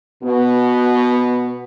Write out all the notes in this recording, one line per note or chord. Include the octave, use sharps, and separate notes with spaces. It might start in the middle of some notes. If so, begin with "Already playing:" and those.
B2 B3